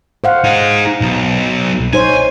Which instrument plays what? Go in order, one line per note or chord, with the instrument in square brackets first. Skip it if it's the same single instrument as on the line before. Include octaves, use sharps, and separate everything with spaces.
[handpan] C5 F5 F#5
[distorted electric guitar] D#4 G#4
B1
[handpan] D#4 C5 C#5 [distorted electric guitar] G#5